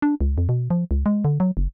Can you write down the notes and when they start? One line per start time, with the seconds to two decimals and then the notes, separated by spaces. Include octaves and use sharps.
0.02 D4
0.21 C#2
0.38 F2
0.49 B2
0.70 F3
0.91 C#2
1.06 G#3
1.25 D3
1.40 F#3
1.57 F#1